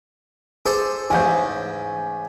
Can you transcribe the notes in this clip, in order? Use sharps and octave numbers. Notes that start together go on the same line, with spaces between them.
G#4 A4 C5 D6
A1 G#2 C#3 G#5 G6